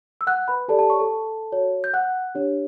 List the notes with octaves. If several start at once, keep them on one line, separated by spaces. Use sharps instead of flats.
E6
F#5 F#6
B4 B5
G4 A4 D5 A5
A4 A5
C#5 C#6
A4 A5
F#4 C#5
G6
F#5 F#6
D4 G4 C#5